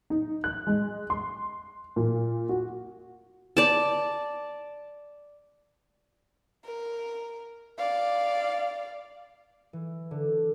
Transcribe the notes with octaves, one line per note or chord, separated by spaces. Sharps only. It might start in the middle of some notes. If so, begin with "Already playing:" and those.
D#4
F#6
G#3
C6
A#2
F#4
D5 A5
A#4
D5 F5
E3
D3